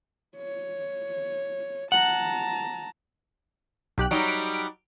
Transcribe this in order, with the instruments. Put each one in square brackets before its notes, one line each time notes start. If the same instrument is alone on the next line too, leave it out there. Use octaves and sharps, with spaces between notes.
[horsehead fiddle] C#5
[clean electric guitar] F#5 [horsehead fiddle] A5 A#5
[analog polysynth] B1 G4 F#6
[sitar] F#3 G3 D#4 [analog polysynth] D7